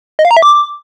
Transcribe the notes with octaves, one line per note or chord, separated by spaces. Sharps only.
D#5
F5
A#5
E5
D6